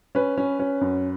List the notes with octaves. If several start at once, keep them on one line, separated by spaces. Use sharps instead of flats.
C#4 B4
C#4
C#4
F#2